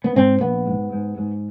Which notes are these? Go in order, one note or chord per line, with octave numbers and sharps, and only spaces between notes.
B3
G#2 C4
A#1 B3
G#2
G#2
G#2